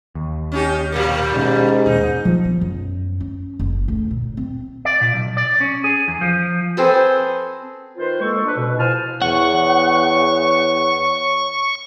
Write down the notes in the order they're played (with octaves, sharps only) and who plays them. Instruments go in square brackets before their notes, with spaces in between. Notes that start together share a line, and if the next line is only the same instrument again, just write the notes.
[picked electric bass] D#2
[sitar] C#4 D#4 G4
A2 G3 A#3
[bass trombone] G#2 [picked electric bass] B2 C#4
[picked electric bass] D#2 A#2 [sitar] D#4
[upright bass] F3
B3
F#2
C#4
F#1
D2
A#2
C4
[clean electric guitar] D5
A#2
B1
D5
C#4
G#4
E2
F3
[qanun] C4 G#4 A4 B4
[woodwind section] D#3 F4 B4 C5
D2 G#3 A#3 A4 C#6
D4 B4
B2
F3 E4 C5 G#5 A5 F6
[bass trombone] E2 [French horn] C#5 [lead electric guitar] F#5 [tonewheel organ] C#6